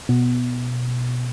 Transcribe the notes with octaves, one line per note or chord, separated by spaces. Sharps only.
B2